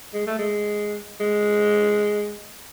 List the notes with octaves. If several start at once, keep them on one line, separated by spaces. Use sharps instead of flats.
G#3
A3
G#3
G#3